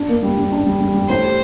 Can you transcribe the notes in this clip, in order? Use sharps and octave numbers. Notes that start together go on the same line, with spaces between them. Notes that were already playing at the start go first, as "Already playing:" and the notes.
Already playing: D4
A#3
G3
G3
D4
G3
G3
G3
A2 C5
G4